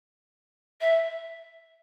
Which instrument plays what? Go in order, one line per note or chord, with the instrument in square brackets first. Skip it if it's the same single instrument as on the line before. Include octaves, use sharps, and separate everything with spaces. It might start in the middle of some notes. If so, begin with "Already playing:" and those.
[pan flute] E5